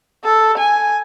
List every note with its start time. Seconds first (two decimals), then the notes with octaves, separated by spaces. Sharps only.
0.24 A4
0.58 G#5